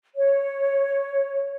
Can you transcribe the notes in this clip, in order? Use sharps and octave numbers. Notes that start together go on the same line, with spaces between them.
C#5